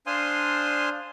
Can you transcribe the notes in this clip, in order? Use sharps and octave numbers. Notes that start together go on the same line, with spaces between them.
D4 C5 F5 G#5 C6 D#6